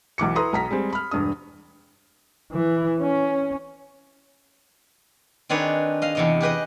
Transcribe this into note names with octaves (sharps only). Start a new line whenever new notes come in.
B1 E3 D6 C#7
E4 A4 B4 A#5 C6 D#6
B1 A#5 B6
G3 G#3 C4
B5 F6
E1 G2 D4 D#6
E3
C#4
D#3 C4 D4 G#4 B4 C#5
D#5 F5
E2 C3 D#5
G4 G#4 B4 D#5